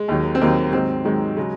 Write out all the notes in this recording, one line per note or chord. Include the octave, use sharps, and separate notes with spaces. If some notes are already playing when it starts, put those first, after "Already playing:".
Already playing: G#3
D#2 D#3 F#3
C4
D#2 D#3 F#3 A#3
G#2 D#3 F#3 C4
G#2 D#3 F#3 G#3
C#3 F#3 G#3